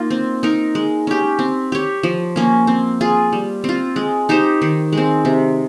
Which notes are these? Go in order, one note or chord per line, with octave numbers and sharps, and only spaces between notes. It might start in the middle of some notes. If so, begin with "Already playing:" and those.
Already playing: A#3 D#4 F4
C4
D#4 A#4
G#3
C#4 G4
C4
G4 C#5
F3
A#3 C#4
C4
F4 G#4
G3
C4 F4
G#3
D#4 G4 C5
D#3
G#3 C4
C3